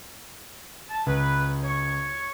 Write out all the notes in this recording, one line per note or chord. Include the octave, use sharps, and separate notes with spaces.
A5
C#2 B4
C#5 C#6